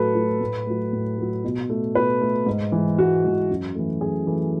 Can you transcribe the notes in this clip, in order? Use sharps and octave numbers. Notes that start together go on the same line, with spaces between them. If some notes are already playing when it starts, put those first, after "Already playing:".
Already playing: A2 F#3 A3 A4 B4
F#3 A3
A2
F#3 A3
A2
F#3 A3
B2
A3
B2 B4
A3
G#2
E3 G#3
G#2 F#4
E3 G#3
F#2
E3 A3
F#2 G#4
E3 A3